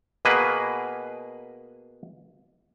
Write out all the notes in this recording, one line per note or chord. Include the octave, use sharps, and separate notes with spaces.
B2 A#3 G#4 B4